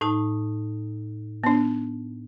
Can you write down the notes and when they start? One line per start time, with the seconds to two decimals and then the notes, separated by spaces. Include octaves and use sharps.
0.01 A2 D#4 A5
1.44 B3 D4